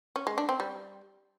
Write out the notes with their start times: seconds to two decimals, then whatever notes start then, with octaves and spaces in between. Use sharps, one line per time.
0.16 C#4
0.27 G#3
0.38 D4
0.49 C4
0.60 G3